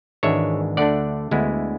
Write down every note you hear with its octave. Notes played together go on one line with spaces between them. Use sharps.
G#1 G#2 E3 G#3 D4 C#5 E5
D2 D3 A3 D4 D5 F#5
D2 D3 G#3 B3 E4